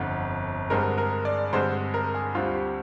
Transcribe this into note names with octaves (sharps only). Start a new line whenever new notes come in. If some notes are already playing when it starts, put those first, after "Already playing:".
Already playing: G1 F2 D3
G2 D3 G#3 C4 A#4
A#4
D5
G2 D3 G#3 C4 C5
A#4
G#4
D2 D3 G3 C4 F4
G4